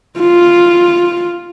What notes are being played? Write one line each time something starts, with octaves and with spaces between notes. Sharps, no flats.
F4